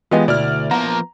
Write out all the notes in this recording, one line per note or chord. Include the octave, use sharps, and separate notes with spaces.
E3 G#3 B3 F4 G4 D#5 G#5
D2 B2 E4 D5 F6
F3 A#3 B3 A#5